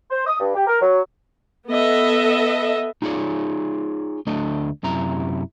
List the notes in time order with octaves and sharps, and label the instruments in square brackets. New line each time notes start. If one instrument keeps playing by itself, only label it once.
[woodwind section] C5
D#6
G2
G4
A#4
F#3
[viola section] B3 A4 D#5 E5
[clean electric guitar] D#4 F4 G#4 C#5 D5
D2 A3 D4 D#5
F#2 C3 E4 A#5